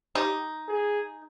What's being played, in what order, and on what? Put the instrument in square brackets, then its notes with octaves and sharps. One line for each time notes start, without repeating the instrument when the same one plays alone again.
[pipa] D#4 [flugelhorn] G4
[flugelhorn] G#4